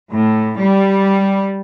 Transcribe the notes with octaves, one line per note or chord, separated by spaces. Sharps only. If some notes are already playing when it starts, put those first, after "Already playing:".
A2
G3